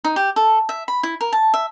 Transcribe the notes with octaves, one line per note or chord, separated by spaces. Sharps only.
D#4
G4
A4
E5
B5
E4
A#4
A5
E5